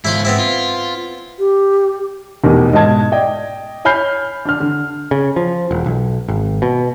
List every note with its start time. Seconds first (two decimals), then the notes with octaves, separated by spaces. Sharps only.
0.05 G#2 E4 F4 C5 C6
0.25 G#2 B3 C4 E4
0.39 F4
1.39 G4
2.44 F1 E2 B2 D#4 G4 A#4
2.73 G#2 B2 D#5 A5 G#6
3.12 D5 D#5 G5
3.85 C#5 G#5 B5 F6 G6 C7
4.45 D4 F6
4.60 D3
5.11 C#3
5.36 F3
5.71 E1
5.86 B1
6.28 G#1
6.62 B2